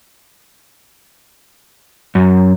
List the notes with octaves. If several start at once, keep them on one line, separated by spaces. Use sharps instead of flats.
F#2